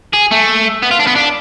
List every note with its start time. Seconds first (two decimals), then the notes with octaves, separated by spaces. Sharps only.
0.14 G#4
0.32 A3
0.82 B3
0.91 F4
0.99 D4
1.07 B3
1.15 D4